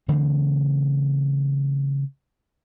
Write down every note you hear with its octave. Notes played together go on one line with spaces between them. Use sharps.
C#3 E3 A3 C4